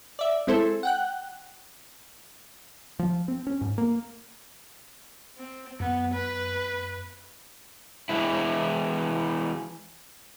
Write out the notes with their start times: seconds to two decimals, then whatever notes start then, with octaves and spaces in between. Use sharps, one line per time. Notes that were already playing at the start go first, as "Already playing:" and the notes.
0.19 D5 E5
0.47 G#3 C4 E4 A4 C5
0.83 F#5 G5 F#6
2.99 F3
3.28 C4
3.47 C#4
3.61 G#2
3.78 A#3
5.38 C4
5.80 F#2 B3
6.14 B4
8.09 E3 G#3 E4